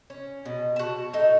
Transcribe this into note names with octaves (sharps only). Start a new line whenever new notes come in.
C#4
B2
F#4 A5
A2 D#4 A4